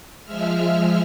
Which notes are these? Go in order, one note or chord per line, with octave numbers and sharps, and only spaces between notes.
F3 G#3 E5 F6